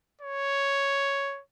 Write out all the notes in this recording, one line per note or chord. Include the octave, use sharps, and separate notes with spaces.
C#5